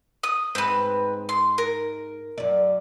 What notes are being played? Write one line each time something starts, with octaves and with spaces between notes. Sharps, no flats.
D#6
G#2 C4 B4
C6
A#4
F#2 D5